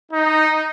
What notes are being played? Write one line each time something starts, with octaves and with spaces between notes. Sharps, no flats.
D#4